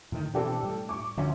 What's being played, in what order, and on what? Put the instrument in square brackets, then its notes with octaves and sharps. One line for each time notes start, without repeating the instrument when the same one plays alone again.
[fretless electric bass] A2 D3 D#3
[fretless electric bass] B2 E3 C4 [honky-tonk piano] D4 G4 A4
[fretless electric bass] A2 G3
[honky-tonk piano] C#6 D6
[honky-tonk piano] D2 [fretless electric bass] D3 F3 C#4